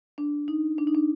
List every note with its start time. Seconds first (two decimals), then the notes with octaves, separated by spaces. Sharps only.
0.18 D4
0.48 D#4
0.78 D4
0.87 D#4
0.95 D4